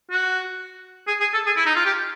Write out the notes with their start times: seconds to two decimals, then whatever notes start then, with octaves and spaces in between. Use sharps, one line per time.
0.11 F#4
1.07 G#4
1.20 G#4
1.33 A4
1.46 G#4
1.56 E4
1.66 D#4
1.76 F4
1.85 G4